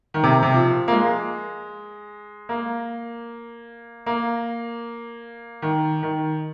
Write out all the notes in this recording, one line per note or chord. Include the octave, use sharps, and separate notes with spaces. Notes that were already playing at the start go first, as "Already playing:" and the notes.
D#3
C3
C3
F3
A#3
G#3
A#3
A#3
D#3
D#3